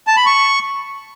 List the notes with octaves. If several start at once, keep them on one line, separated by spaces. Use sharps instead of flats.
A5
B5
C#6